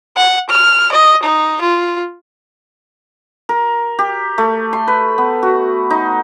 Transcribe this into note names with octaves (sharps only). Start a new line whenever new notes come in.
F#5
F6
D#5
D#4
F4
A#4
G4
A3
C6
B4
B3
F#4
D#4